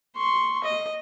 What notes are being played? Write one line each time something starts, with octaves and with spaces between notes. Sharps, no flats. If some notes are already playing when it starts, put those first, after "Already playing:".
C6 C#6
D#5